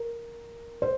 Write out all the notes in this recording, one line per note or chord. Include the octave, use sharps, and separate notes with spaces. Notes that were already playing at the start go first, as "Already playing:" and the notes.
Already playing: A#4
C5